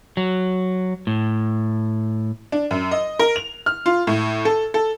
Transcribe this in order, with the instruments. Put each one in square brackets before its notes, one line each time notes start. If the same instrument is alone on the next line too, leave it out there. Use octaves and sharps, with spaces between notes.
[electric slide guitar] F#3
A2
[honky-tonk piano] D4
F#2
D#5
A#4
F7
F6
F4
A2
A4
A4